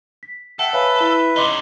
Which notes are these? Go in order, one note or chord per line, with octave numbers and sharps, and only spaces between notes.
B6
A4 E5 F#5 G5
B4 C#5 E5 F5 G#5
E4 G7
C#3 D#4 D#5 C6 D6